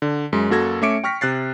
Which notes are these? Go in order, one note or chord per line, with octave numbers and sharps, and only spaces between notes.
D3
F#2 G#3
F#2 A#3 F#4 A4 G#6 A#6
A3 C#4 E5 D6 C#7 D7
G5 C#6 F6 A#6 B6
C3 F#6 A6 C7